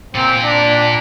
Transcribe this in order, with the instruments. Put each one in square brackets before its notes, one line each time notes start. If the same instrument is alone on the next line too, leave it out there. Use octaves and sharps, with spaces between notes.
[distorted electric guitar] A#2 A#4 [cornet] C4
[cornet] D4